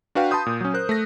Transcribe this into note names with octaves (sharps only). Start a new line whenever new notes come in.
D4 F#4 B4 F5 G5
A5 B5 C6 D#6 G6
A#2
F#3 C#4
A#4 C5 F#6
A3 A#6